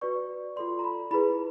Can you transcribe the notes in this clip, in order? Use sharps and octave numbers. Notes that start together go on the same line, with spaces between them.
F#4 B4 D5 C#6
F4 A4 D5 C6
A#5
B5
E4 G#4 B4 B5